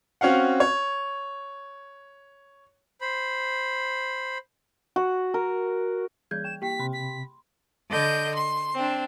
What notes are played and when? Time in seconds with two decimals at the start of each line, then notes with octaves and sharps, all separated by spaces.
0.21 C4 C#4 F#4 F5 F#5
0.60 C#5
3.01 C5 B5
4.96 F#4
5.34 A#4
6.31 E3 G3 G#4 G6 G#6
6.44 G5 E7
6.62 A#3 G4 G5 B6
6.79 C3 B5 C6
6.93 B6
7.90 D3 D#5 G6
8.34 C6
8.74 C4 D4